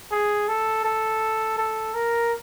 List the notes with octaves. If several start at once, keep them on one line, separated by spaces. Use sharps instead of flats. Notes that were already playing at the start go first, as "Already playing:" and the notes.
G#4
A4
A4
A4
A#4